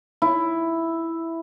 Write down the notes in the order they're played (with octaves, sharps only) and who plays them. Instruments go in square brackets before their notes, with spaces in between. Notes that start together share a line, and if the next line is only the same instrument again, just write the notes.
[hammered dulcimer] E4